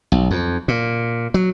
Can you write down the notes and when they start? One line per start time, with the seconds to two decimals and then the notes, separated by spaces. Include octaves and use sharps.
0.12 B1
0.31 F2
0.68 A#2
1.34 F#3